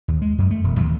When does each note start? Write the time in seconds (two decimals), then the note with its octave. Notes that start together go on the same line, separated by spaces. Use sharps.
0.08 D#2
0.22 G#3
0.38 F#2
0.51 A3
0.64 E1
0.80 D#2